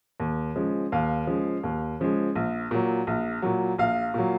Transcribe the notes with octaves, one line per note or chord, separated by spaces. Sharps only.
D#2
C#3 F3 G#3
D#2 F5
C#3 F3 G#3
D#2
C#3 F3 G#3
A#1
A#2 F#3
A#1
A#2 F#3
A#1 F5
A#2 F#3